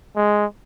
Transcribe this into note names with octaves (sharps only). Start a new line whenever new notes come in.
G#3